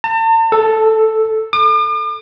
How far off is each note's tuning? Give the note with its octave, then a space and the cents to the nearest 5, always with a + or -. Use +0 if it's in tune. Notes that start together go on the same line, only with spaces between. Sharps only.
A5 +40
A4 +0
D6 +45